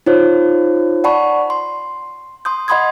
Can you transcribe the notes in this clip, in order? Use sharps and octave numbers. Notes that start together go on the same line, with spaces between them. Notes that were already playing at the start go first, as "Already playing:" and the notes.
D#4 F4 C5 C#5
D5 F#5 A5 B5 C#6
C6
C6 D#6 G6
D#5 F#5 B5 C6 D#6 G#6